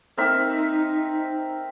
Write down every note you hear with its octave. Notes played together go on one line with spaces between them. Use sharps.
C4 D#4 A#4 E5